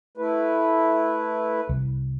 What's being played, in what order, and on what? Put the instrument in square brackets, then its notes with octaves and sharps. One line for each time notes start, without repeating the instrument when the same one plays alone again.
[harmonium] A3 E4 B4
[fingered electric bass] C2